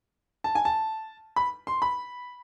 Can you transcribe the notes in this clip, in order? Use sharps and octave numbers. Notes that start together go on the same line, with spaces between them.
A5
G#5
A5
B5
C6
B5